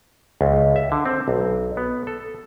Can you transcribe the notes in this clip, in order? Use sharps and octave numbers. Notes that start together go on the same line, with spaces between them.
C#2
E5
D3
C4
B1
B3
A4